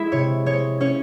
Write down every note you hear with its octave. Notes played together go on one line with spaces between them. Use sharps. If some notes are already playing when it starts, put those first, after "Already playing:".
Already playing: G#3 E4 E5
C3 C#5
G#3 C#5
C#4 C#5